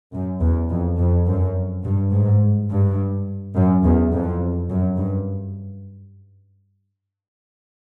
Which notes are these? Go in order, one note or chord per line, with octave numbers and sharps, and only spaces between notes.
F#2
E2
F2
F2
F#2
G2
G#2
G2
F#2
E2
F2
F#2
G2